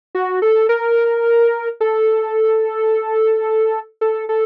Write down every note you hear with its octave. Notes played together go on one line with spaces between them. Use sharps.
F#4
A4
A#4
A4
A4
A4